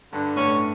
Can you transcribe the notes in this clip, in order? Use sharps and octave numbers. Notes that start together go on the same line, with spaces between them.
G2 D3
A2 C#4